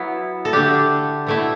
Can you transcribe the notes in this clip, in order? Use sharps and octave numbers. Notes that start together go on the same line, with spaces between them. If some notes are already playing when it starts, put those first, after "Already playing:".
Already playing: F#3 B3 E4
A4
D3 A3 D4 G4
B2 A3 E4